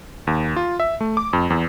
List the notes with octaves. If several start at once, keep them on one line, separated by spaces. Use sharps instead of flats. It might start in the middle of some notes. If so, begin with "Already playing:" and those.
D#2
F4
E5
A3
D6
F2
E2